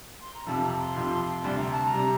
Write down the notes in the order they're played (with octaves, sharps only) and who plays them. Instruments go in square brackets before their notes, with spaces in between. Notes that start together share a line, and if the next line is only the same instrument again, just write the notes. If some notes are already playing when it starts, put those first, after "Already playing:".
[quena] C6
A#5
[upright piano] F2 C3 F3 [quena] A5
[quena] A#5
C6
[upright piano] F2 C3 F3
[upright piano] D2 C3 G3 [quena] C6
[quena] A#5
A5
A#5
[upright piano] C3 G3